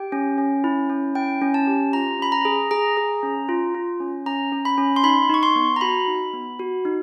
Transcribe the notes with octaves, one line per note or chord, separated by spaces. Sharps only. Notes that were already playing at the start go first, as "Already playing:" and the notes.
Already playing: G4 G5
C#4
C#4
E4
C#4
E4 G5
C#4
A5
G4
F4 A#5
C#4 B5
A#5
G#4
G#4 A#5
G#4
C#4
F4
F4
C#4
C#4 A#5
C#4
B5
C#4
C6
D#4 B5
D#4 C#6
C6
B3
A#5
F#4 B5
D#4
B3
F#4
D#4